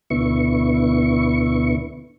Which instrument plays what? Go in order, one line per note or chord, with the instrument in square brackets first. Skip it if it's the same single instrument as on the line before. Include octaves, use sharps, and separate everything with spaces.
[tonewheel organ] D2 B2 D3 B3 E4 C#6